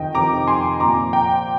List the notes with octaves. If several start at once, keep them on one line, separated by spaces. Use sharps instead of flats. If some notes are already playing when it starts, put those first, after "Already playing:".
Already playing: F2 C3 D#3 D#5 G5
F2 C3 D#3 A#5 D6
G#5 C6
A#2 F3 C4 A#5 D6
G5 A#5